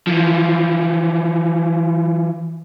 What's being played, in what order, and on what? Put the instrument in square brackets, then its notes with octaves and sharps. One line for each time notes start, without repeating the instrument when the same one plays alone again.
[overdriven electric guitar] E3 F3